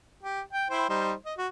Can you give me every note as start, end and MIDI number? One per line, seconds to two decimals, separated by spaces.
0.23 0.41 67
0.53 0.67 79
0.70 0.85 64
0.70 0.85 72
0.70 0.85 79
0.89 1.13 55
0.89 1.13 63
0.89 1.13 72
1.25 1.34 75
1.38 1.47 66